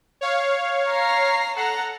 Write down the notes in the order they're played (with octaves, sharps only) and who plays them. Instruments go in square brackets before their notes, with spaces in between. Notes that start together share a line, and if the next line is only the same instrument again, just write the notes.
[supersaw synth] C#5 F5
[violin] A#5 C7
[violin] A4 A#5 [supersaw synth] F#5